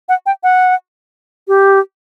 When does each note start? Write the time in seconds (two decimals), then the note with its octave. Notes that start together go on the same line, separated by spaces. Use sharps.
0.09 F#5
0.26 G5
0.43 F#5
1.48 G4